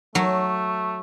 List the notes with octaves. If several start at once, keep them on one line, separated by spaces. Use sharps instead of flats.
F#3 A3